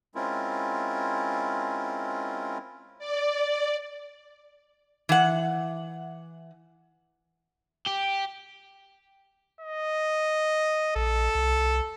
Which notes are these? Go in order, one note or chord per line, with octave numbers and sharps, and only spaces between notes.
G#3 C4 C#4 E4 F4 A#4
D5
E3 F#5
G4
D#5
A#1 A4
C2